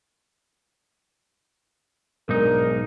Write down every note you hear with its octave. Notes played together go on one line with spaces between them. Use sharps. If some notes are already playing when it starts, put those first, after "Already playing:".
B1 G#2 D4 D#4 G#4 A#4